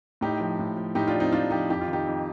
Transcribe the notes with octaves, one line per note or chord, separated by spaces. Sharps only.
A2 D#4 G4
F3
A2
F3
A2 D#4 G4
D4 F4
F3
C4 D#4
A2 D4 F4
F3 D#4 G4
F2 G4
F4
D#3
D#4 G4
F2